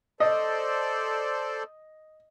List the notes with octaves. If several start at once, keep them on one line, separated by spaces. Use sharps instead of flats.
A4 C5 D5 D#5